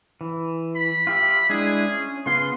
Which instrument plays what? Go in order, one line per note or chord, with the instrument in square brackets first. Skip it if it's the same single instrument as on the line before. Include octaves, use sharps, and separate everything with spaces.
[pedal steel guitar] E3
[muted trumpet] B5
[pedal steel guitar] F4 G4 E5
[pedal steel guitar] G#3 D4 E4 [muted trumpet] G#4
[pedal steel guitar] C#4
[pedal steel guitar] C#3 B3 F4 [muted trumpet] C6